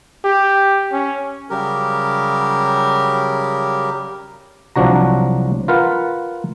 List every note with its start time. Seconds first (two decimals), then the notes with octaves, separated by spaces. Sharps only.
0.24 G4
0.92 C#4
1.49 C#3 F#3 G3 G4 A#4
4.76 C2 F3 F#3 D4 F#4 A#5
5.68 F4 A#4 B4 F#5